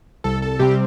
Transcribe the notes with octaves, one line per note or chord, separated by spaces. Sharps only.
C2 A4
A4
C3 G3 C4 G4